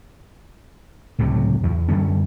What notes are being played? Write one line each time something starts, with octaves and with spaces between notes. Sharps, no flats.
C#2 A2 C3 F#3
E2
F#2 D3 G3 C#4